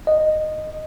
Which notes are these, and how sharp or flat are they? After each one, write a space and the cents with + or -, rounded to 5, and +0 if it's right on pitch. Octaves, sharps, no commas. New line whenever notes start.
D#5 -10